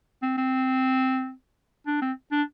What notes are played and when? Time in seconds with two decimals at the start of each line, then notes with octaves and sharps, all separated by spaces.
0.23 C4
0.38 C4
1.87 D4
2.02 C4
2.32 D4